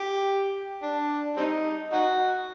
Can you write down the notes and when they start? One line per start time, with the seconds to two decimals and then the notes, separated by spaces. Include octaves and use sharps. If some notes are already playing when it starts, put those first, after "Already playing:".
Already playing: G4
0.82 D4
1.37 G3 C4 D#4
1.92 D#4 F#4